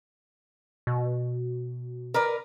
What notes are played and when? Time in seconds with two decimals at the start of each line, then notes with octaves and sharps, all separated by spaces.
0.87 B2
2.14 A#4 B4 D5